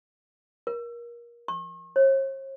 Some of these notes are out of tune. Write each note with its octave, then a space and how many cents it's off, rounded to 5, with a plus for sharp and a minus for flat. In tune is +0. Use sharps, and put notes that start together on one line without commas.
A#4 +25
C#6 -45
C#5 -45